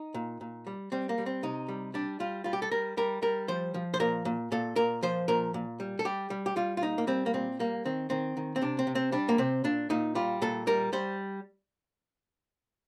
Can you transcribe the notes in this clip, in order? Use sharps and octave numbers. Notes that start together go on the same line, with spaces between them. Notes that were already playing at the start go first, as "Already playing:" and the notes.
Already playing: D#4
A#2
A#2
G3
G3 C4
A#3
G3
C4
C3 D#4
G3
G3 D4
G3 F4
G3 F4
G4
A4
G3 A#4
G3 A#4
G3 A#4
F3 C5
F3
C5
A#2 A#4
A#2
A#2 A4
A#2 A#4
F3 C5
A#2 A#4
A#2
G3
A4
G3 G4
G3
G4
G3 F4
F4
A#2 D#4
A#3
G3 C4
A#3
A#2 C4
G3 A#3
D#3 C4
D#3 C4
D#3
C4
C3 D4
C4
C3
C4
G3 D4
A#3
C3 C4
A#2 D4
A#2 D#4
G3 F4
A#2 A4
G3 A#4
G3 C5